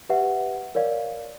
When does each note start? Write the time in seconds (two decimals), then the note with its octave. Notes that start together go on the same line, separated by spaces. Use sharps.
0.09 G4 B4 E5 F#5
0.75 A#4 C#5 D5 F5